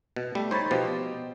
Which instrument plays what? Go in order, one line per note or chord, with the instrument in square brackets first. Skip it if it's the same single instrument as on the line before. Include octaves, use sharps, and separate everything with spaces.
[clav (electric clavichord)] B2
[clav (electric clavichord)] G3 [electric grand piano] A3
[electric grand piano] D#4 B5 A6 [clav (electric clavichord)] C5 C#5
[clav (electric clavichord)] B2 F3 [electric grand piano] G4 C5 D#5